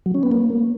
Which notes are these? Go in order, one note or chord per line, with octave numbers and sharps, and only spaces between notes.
F#3
C#4
B3
A#3